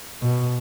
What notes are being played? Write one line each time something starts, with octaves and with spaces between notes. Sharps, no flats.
B2